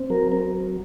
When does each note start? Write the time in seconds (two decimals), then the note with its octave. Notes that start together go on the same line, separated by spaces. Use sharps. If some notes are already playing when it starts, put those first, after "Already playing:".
Already playing: C4
0.10 F#3 A#4
0.32 A#4